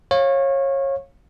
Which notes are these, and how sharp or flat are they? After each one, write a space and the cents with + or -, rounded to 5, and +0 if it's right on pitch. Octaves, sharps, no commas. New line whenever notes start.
C#5 -25 F5 +5